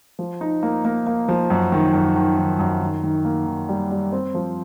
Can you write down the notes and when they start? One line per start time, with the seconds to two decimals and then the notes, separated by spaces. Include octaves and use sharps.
0.19 F3
0.41 D#4
0.63 A#3
0.85 A#3
1.07 A#3
1.29 F3
1.50 F#2
1.72 D#3
1.94 F#2
2.16 D#3
2.38 D#3
2.59 F#2
2.81 D#3
3.03 D#3
3.25 A#3
3.47 D#3
3.69 G3
3.91 G3
4.12 C4
4.34 F3